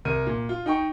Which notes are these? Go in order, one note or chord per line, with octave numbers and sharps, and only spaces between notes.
C2 A#4 D#7
A#2
F4
D#4 G5 C#6